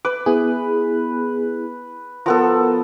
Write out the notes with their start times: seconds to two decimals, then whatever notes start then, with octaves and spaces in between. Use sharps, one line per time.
0.05 B4 D6
0.26 B3 E4 G#4
2.26 F3 B3 A4 A#4 A#5